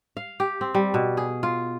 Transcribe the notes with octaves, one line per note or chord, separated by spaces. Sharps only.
F5
G4
C4
G3
B2
G#4
F4